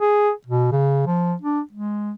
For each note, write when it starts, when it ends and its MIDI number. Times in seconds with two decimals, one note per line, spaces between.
0.01 0.30 68
0.47 0.70 47
0.72 1.02 49
1.06 1.34 53
1.42 1.61 62
1.73 2.13 56